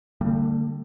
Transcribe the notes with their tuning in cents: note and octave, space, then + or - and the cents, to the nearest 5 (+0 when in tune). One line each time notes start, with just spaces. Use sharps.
D3 +10 G3 -5 A#3 -40